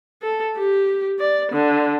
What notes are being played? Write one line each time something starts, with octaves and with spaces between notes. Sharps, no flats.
A4
G4
D5
D3